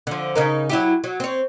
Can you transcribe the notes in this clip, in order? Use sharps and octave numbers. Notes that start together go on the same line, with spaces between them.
D3 F3
C#3 D#4 A#4
F#3 E4 G4
F#3
C4 C#5